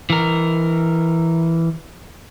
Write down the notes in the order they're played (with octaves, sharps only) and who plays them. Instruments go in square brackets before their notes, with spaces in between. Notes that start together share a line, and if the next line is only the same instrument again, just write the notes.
[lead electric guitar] E3 A#4